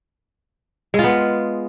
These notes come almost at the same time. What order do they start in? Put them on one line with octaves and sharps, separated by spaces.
G#3 F4 B3